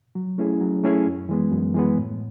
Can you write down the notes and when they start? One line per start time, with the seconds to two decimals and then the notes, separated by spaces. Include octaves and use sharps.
0.15 F#3
0.38 A3 C#4 E4 G#4
0.61 F#3
0.84 A3 C#4 E4 G#4
1.06 F#2
1.29 E3 G#3 B3
1.51 F#2
1.74 E3 G#3 B3
1.97 A2